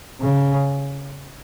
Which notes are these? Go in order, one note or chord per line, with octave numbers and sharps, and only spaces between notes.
C#3